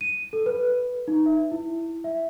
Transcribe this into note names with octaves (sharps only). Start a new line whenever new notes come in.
D#7
A4
B4
D#4
E5
E4
E5